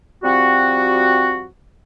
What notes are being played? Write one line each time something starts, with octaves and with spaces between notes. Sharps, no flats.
F3 G3 C4 F#4